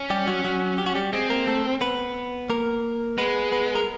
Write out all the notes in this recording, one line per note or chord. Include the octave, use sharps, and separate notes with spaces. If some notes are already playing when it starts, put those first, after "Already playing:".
Already playing: C#4
G3 G4
F#3 F#4
F#3 F#4
G4
F#4
G3 G4
G#3 C4 G#4
A#3 A#4
A3 A4
B3 B4
A#3 A#4
G#3 B3 B4
B3 B4
A#4